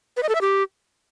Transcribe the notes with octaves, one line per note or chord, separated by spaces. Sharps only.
B4
D#5
A4
E5
G4